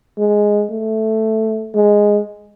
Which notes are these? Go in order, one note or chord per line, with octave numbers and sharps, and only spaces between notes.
G#3
A3
G#3